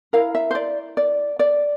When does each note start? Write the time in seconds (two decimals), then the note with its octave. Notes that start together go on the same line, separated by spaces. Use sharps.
0.13 E4 A#4 F5
0.35 E5
0.51 C5
0.55 D5
0.97 D5
1.39 D5